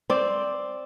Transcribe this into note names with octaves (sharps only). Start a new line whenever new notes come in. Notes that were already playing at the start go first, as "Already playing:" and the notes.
C4 D5